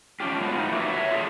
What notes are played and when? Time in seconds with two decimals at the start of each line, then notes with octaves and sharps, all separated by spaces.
0.20 C#4 D4 F4 G4
0.41 G#3 B3 F4 F#4 C5
0.57 A2 A3 D#4
0.72 F#4 G4 A#4 B4 C#5 E5
0.90 C#5 E5
1.11 F4 G#4 A4